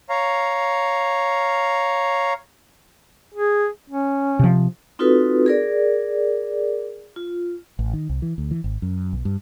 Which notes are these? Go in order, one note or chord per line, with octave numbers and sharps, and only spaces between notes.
C#5 F5 A#5
G#4
C#4
C3 F3
C4 D#4 F4 F#4 A4 B4
G#4 A#4 D5
F4
A1
D#3
C2
E3
D2
E3
G#1
F#2
B1
G2